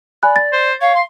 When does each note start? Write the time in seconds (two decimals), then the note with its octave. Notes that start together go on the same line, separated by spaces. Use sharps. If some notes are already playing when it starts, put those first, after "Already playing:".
0.23 D5 G#5 B5 F#6
0.36 A6
0.53 C5
0.81 C#5 F5
0.95 C6